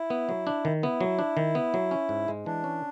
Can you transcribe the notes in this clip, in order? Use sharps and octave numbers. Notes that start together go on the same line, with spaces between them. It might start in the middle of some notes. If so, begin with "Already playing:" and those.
Already playing: E4
B3
F#3
D4
D#3
B3 E4
F#3
D4
D#3
B3
F#3
C#4
G#2
G#3
E3 D4
C#4